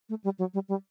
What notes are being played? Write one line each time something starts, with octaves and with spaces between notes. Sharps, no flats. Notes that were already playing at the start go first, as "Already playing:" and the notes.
A3
G3
F#3
G3
G3